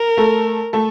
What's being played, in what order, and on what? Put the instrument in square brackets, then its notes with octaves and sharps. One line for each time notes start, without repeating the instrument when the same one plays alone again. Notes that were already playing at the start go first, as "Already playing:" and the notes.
Already playing: [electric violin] A#4
[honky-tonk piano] A3 A4
A3 A4